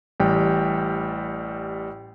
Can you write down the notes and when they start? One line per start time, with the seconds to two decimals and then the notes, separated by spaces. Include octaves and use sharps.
0.20 A1 G3 G5